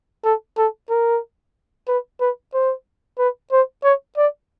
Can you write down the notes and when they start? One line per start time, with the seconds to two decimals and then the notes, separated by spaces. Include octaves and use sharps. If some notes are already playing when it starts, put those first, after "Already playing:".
0.24 A4
0.58 A4
0.90 A#4
1.88 B4
2.21 B4
2.54 C5
3.18 B4
3.52 C5
3.84 C#5
4.17 D5